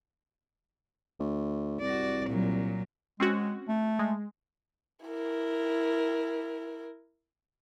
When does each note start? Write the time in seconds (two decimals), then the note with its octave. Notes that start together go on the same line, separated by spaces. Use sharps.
1.20 D2
1.81 C2 F#4 D5
2.27 A#2 F#3
3.20 G#3 C4 C#4 F#4
3.68 A3
3.99 G#3
5.06 E4 A#4